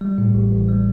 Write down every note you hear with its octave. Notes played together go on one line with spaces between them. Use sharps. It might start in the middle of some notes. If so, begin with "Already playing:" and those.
G3
A2
A1
A1
G3